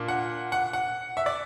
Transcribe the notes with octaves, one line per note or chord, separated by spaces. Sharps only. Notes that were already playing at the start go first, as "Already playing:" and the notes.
Already playing: A#2 A#3 D4
F#5
F#5
F#5
E5
D5